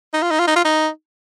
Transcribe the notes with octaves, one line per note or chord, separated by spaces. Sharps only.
D#4
F4
D#4
F4
D#4
F4
D#4